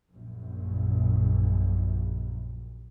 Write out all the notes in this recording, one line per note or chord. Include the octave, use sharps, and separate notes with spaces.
A#1 F#2